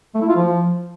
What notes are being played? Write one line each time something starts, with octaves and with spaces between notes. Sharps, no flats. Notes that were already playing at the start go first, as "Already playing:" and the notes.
A3
E4
F4
F3